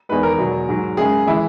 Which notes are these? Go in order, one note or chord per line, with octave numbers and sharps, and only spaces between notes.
E2 D#3 G#3 B4
A#4
E2 B2 F#3
G#2 F#3
F#2 C#3 G#3 G#4
E3 G#3 E4